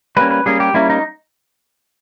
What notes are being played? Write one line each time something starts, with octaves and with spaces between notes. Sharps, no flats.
G3 A#3 C#4 B4
B4
G3 A#3 C#4 G#4
G4
G3 A#3 C#4 E4
D#4